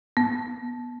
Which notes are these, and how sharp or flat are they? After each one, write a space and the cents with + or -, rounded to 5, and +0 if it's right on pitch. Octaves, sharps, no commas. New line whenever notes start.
B3 -15